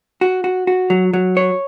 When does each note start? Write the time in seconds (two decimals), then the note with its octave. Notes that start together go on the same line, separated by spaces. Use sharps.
0.21 F#4
0.44 F#4
0.67 F#4
0.90 F#3
1.13 F#3
1.37 C#5